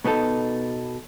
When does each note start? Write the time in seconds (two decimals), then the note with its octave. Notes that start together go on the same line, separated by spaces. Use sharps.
0.05 B2 B3 D#4 A4